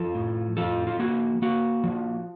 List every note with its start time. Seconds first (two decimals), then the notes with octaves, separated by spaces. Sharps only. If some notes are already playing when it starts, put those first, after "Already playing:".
Already playing: F3 F4 A4
0.15 A2
0.57 F3 F4 A4
0.87 F4
1.00 A#3 F#4
1.42 A#3 F#4
1.84 F3